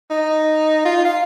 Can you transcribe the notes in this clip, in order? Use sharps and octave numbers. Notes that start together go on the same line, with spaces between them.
D#4
F4
F5